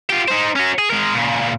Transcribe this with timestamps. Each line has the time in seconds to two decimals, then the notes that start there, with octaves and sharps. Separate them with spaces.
0.10 F4 G4
0.28 D#4 C5
0.56 C#4 F#4
0.79 G#4
0.90 G#3 A#4
1.14 A#2 C#3